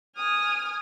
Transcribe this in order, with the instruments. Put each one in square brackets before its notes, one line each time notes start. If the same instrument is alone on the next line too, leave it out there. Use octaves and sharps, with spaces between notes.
[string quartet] G#5 D#6 F6